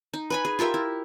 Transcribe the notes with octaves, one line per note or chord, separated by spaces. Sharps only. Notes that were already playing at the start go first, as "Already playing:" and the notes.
D#4
B4 G#5 B5
G#4
F4 G4 A#4 E5
E4